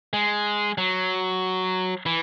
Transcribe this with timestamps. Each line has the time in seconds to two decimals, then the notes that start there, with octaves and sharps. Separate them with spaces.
0.13 G#3
0.78 F#3
2.06 E3